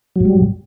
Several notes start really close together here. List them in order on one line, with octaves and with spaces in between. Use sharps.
F#3 G#2 G3